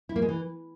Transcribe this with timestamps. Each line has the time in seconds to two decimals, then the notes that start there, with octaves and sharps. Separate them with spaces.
0.09 E4
0.16 A#3
0.22 G#3
0.29 E3